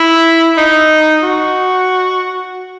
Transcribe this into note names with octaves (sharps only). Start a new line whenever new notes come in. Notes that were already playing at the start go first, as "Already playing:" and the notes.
Already playing: E4
D#4
F#4